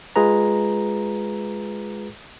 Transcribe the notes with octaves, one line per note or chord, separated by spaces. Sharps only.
G#3 F4 G#4 B4 A#5